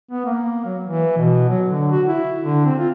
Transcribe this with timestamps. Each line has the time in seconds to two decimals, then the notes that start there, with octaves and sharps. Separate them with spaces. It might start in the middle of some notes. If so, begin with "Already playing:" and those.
0.11 B3
0.26 A#3
0.65 F#3
0.84 E3
1.18 B2
1.49 F#3
1.68 D3
1.91 F#4
2.08 E4
2.44 D3
2.65 C4
2.78 F4